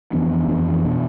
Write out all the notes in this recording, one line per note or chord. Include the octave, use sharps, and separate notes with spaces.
F2 E3 B3 D4
F2 E3 B3 D4
B2 B3 D4